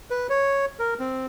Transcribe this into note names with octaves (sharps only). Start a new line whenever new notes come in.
B4
C#5
A#4
C4